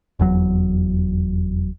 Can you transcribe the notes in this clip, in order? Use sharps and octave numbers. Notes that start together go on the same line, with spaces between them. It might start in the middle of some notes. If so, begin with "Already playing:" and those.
F1 E2 F#3